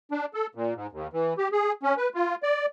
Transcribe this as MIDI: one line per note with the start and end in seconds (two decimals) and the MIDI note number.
0.11 0.26 62
0.34 0.47 69
0.55 0.74 46
0.75 0.87 44
0.92 1.07 39
1.13 1.34 52
1.38 1.48 67
1.52 1.72 68
1.83 1.94 61
1.97 2.09 71
2.14 2.35 65
2.43 2.66 74